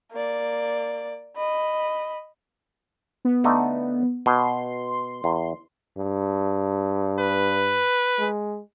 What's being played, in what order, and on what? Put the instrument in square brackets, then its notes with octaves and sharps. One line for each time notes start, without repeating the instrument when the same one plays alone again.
[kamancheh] A#3 D5
D#5 B5
[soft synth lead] B3
[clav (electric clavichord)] D3 A3 D#4
[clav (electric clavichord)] B2 [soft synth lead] C6
[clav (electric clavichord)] E2
[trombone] G2
[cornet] B4
[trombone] G#3